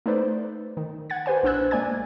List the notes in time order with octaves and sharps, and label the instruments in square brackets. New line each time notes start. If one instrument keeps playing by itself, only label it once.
[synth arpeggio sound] A3 D#4 A4 B4 C5 D5
D#3
F#5 G#6 A6
G4 B4 C5 G#5
A#1 D4 C5 E6 F#6 G#6
G#3 A#3 D5 G#5 G#6